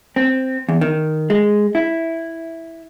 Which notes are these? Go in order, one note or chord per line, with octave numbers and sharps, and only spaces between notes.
C4
E2
D#3
G#3
E4